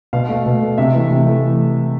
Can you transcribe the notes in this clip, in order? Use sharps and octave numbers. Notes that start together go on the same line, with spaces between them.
B2 F5
A3
B2
A3
C3 E5
E3 A3
C3
E3 A3